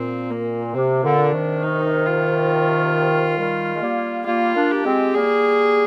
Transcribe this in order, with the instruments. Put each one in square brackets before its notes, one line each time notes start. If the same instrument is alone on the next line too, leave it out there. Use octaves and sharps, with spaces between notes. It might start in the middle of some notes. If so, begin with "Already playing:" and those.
Already playing: [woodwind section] A#2 [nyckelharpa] C4
[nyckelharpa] A#3
[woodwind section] C3 [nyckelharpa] C4
[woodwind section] A#2 D3
[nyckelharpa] D4
[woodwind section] C3 D#3
[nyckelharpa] D#4
F4
[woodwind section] D#3 G3
G#3
G3 A#3
[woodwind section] G3 A#3 [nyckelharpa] F4
[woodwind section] A#3 D4
[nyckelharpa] G4
[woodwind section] G#3 C4
[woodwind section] G3 A#3 [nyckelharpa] G#4